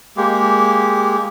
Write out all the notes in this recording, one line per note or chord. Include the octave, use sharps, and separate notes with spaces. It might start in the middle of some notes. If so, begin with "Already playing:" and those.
G#3 A#3 G4